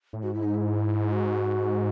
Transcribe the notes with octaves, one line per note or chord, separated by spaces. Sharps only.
A2
G#2 F#4
E4
D#4
E4
F#4